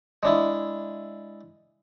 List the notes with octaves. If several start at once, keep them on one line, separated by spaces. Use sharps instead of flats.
G#3 D4 E4